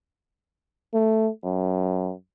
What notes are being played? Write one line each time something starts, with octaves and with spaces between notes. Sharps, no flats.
A3
F#2